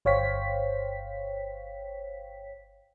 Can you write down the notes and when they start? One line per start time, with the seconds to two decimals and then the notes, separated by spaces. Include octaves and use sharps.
0.05 G1 C5 C#5 F5 G5 B6